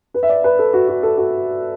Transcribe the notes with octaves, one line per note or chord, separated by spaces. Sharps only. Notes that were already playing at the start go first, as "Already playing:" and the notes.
B4
E5
D5
B4
A4
F#4
F#4
A4
F#4